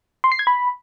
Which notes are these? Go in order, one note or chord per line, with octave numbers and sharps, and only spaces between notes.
C6
C7
G#6
B5